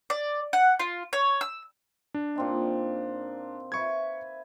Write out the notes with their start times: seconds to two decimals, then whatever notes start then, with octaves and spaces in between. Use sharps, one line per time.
0.10 D5
0.53 F#5
0.80 F4
1.13 C#5
1.41 E6
2.14 D4
2.36 A#2 C4 D#4
3.72 B4 E5 C#6 G#6